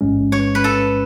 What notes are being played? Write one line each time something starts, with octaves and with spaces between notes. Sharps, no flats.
A1 G#2 G#3 C#4
C#5
B4
A4